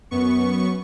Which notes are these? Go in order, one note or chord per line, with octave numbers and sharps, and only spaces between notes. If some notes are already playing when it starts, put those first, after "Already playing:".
F#2 B3 C#6